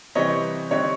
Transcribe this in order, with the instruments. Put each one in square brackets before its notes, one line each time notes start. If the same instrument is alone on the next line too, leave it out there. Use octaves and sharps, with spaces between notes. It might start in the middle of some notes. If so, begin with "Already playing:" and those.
[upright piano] C3 E3 G3 C4 C#5 D#5
D3 G3 C4 D#4 C#5